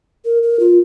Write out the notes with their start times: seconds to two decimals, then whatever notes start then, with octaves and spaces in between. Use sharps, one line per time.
0.25 A#4
0.43 A#4
0.60 F4